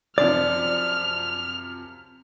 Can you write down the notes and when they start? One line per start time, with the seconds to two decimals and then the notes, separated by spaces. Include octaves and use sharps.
0.18 F#2 C3 F3 D5 F6